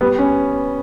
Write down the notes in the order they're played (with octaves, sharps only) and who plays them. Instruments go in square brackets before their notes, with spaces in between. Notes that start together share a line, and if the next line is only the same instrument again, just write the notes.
[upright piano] G3 [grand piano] B3
[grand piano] C#4